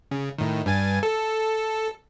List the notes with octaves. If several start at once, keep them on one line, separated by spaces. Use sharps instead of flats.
C#3
A2 D#3
G2 G#5 A6
A4